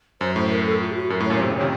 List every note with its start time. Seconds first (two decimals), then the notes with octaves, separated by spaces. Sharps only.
0.21 F#2 C5
0.35 A2 C5
0.51 A#4
0.66 A4
0.80 F4
0.92 A4
0.96 F#4
1.10 F#2 A#4
1.20 A2
1.25 C#5
1.30 F#2 A#2
1.35 C#5
1.40 A2 C3 C5
1.50 A#2 C#3
1.56 C3 D#3 C#5